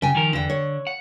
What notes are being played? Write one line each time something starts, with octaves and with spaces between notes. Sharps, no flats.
C#3 G5 G#5
D#3 F3 A#4
E2 D3 G5
C#5
F#5